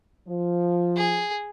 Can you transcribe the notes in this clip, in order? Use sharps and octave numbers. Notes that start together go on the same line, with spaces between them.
F3
G#4